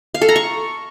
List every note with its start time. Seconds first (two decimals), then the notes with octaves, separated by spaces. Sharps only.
0.14 F5
0.22 A4
0.29 A#5
0.36 C#6